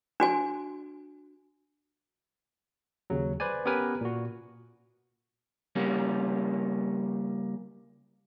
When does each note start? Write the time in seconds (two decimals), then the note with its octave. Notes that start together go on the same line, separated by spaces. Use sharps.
0.20 D4 F#4 G#5
3.10 D#2 C#3 F#3
3.40 B4 C5 D5 G#5
3.65 B3 C#4 G4 A#4 B4 G#5
4.01 A#2 F#4
5.76 C#3 G3 A#3 C#4